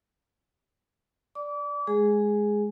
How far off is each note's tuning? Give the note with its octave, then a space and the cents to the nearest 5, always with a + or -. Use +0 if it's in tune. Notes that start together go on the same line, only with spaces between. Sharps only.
D5 +0 D6 -35
G#3 +5 G#4 +0